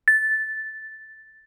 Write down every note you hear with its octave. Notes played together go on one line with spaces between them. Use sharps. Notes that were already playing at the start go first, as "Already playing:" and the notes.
A6